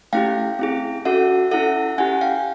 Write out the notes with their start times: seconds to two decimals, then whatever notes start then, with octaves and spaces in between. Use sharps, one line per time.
0.13 A3 C#4 E4 G4 F5 G5
0.59 C4 E4 G#4
1.05 C#4 F#4 A4 E5 F#5
1.51 C#4 E4 A4 E5 F#5
1.98 C#4 E4 G4 F#5 G#5
2.21 F5 G5